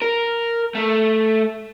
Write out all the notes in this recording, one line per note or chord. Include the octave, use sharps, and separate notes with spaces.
A#4
A3